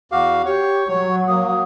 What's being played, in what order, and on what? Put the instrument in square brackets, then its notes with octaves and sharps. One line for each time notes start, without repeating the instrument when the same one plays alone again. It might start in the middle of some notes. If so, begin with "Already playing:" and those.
[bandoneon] E2 F#4 F5 [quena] D6
[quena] G4 [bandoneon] C#5 C#6
[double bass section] F#3 [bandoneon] C#5 [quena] C#6
[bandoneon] A#3 [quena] D#6